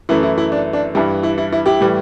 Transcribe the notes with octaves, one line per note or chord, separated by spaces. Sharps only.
F#2 E3 A3 E4
E4
E4
D4
D4
G2 E3 G3 E4
E4
E4
E4
E4 G4
A2 E3 G3